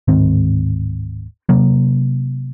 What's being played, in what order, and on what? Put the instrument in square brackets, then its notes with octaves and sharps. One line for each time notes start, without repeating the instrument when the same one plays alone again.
[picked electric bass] D1 G#2 D#3 C4
C3 F#3 A#3